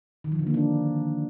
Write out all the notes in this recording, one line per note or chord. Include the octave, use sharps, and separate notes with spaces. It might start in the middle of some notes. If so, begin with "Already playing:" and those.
D#3
F3
D3
A#3
D4